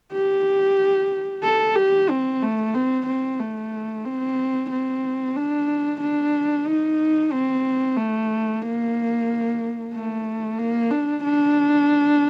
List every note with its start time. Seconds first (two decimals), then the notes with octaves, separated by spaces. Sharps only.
0.13 G4
1.44 A4
1.76 G4
2.10 C4
2.42 A3
2.74 C4
3.07 C4
3.40 A3
4.05 C4
4.71 C4
5.36 D4
6.01 D4
6.66 D#4
7.32 C4
7.97 A3
8.62 A#3
9.93 A3
10.59 A#3
10.91 D4
11.24 D4